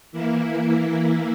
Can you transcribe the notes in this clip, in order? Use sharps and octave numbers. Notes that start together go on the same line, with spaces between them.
E3 A#3 E4